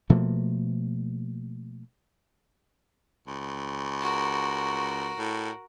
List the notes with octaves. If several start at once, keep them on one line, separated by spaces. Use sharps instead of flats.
B2 F3 A3 A#3
C#2
F#4 A#4
A2